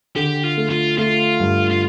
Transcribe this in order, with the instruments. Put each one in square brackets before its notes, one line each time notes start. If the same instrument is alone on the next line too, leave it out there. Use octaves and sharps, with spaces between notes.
[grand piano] D3 [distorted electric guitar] G4
[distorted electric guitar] F4
[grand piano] A3
[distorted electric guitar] F4
[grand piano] A3 [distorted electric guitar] F4
[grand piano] G2
[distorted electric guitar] F4